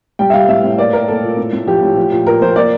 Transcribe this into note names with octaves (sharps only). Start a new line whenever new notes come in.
G3 G5
E5
G3 F5
A2 E5
A2
A#3 D5
A#3 A#4
A#3 A4
A#2
A2
A2
F3 G4
A2
F3
A#2
A#2 A#4
F3 C5
A#3 D5